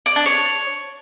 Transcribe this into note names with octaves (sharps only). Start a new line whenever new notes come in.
D5
D4
C#5